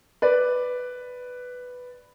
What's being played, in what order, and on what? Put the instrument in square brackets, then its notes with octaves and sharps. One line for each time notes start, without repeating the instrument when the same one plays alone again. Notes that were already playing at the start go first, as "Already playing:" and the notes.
[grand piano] B4 D5